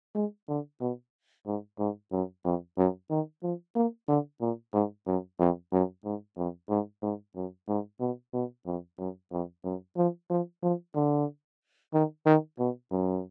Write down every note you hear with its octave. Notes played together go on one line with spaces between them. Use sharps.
G#3
D3
B2
G#2
G#2
F#2
F2
F#2
D#3
F3
A#3
D3
A#2
G#2
F#2
F2
F#2
G#2
F2
G#2
G#2
F#2
G#2
B2
B2
F2
F#2
F2
F#2
F3
F3
F3
D3
D#3
D#3
B2
F#2